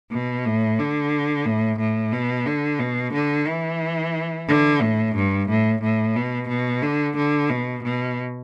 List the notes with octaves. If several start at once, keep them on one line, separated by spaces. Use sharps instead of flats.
B2
A2
D3
A2
A2
B2
D3
B2
D3
E3
D3
A2
G2
A2
A2
B2
B2
D3
D3
B2
B2